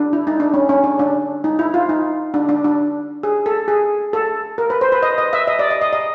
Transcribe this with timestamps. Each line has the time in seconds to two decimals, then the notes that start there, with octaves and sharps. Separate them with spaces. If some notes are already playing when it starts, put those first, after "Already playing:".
Already playing: D4
0.13 E4
0.27 D#4
0.40 D4
0.54 C#4
0.69 C#4
0.84 D4
0.99 D4
1.44 D#4
1.59 E4
1.74 F4
1.89 D#4
2.34 D4
2.49 D4
2.64 D4
3.23 G#4
3.46 A4
3.68 G#4
4.13 A4
4.58 A#4
4.70 B4
4.81 C5
4.92 B4
5.03 D#5
5.18 D#5
5.33 E5
5.47 D#5
5.59 D5
5.70 D#5
5.81 D#5
5.93 D#5